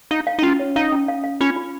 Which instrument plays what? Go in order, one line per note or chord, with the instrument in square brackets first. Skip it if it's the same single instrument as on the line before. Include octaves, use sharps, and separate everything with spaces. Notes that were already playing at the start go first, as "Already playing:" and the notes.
[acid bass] D#4 [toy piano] F5
[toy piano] F5
[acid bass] D#4
[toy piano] C#4 [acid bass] F4
[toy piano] C#5
[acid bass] D#4 [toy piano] F5
[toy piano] C#4
F5
F5
[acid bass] C#4 [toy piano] F4
[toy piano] F4